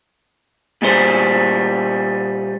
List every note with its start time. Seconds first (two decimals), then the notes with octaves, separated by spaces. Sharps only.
0.82 A#2 G3 C5